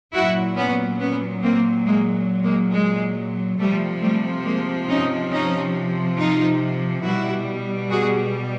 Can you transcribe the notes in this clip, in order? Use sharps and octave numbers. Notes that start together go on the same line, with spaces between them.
A#2 F#3 E4 F#4
B3 C#4
B3 C#4
A#3 C4
G#3 A#3
G#3 A#3
G#3
C3 F3 G3 A3
G3 A3
G#3 A#3
C#4 D#4
C#4 D#4
D#4 F4
B2 G3 E4 F#4
F#4 G#4